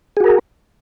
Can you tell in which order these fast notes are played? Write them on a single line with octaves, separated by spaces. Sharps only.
G#4 F#4 A#4